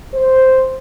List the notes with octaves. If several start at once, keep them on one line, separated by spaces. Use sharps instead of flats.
C5